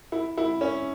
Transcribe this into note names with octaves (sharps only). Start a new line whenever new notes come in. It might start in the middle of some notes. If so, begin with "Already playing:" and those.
E4
E4
C#4